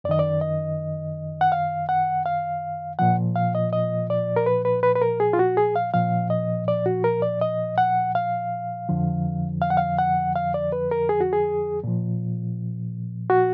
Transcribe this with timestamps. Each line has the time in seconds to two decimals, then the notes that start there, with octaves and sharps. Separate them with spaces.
0.04 F#2 D5
0.09 D#3 D#5
0.19 D5
0.41 D#5
1.41 F#5
1.52 F5
1.89 F#5
2.26 F5
2.99 A#2 F3 F#5
3.36 F5
3.55 D#5
3.73 D#5
4.10 D5
4.36 A#4
4.46 B4
4.65 B4
4.83 B4
4.96 B4
5.02 A#4
5.20 G#4
5.33 F4
5.39 F#4
5.57 G#4
5.76 F5
5.94 A#2 F3 F5
6.30 D#5
6.68 D5
6.86 F#4
7.04 A#4
7.22 D5
7.41 D#5
7.78 F#5
8.15 F5
8.89 F2 D3 F3
9.62 F5
9.70 F#5
9.77 F5
9.98 F#5
10.36 F5
10.54 D5
10.72 B4
10.91 A#4
11.09 G#4
11.21 F#4
11.33 G#4
11.84 A#2 F3
13.30 F#4